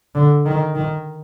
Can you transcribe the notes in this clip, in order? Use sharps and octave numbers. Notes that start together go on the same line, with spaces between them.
D3
D#3
D#3